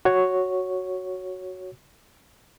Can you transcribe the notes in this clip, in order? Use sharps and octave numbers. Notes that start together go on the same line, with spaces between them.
F#4 C#5